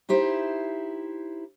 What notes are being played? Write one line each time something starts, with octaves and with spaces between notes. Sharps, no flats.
D#4 E4 G4 C5